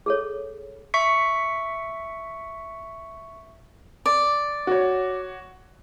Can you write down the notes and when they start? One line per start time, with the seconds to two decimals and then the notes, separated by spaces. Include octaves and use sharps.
0.06 G#4 A4 C#5
0.94 E5 C#6 B6 C#7
4.06 D5
4.67 F#4 C#5